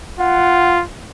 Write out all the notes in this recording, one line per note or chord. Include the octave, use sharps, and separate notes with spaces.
F4 F#5